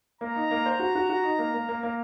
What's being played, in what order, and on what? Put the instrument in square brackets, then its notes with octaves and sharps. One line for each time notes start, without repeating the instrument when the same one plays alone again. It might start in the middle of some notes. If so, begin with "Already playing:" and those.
[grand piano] A#3 [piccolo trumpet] A#5
[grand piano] D#4
A#3
C5
F#4
F#4
F#4
D#4
A#3
A#3
A#3
A#3